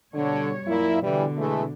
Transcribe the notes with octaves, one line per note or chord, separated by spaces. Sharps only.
B2 D3 G3 C#5
F#2 A#2 A#3 E4
B2 D3 E3 G3
E3 G#3 A3